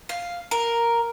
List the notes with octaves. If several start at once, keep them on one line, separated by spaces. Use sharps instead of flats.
F5
A#4